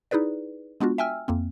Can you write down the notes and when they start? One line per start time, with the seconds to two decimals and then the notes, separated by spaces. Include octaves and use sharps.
0.11 D#4 E4 G#4 B4 D5
0.81 G#3 B3 D4 F4 F#4
0.98 E5 G5 G#5 E6 F6
1.28 F2 A#3 C4